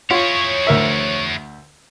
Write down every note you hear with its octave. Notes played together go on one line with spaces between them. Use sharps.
E4 F4 G#4 C#5
D2 A#4 E5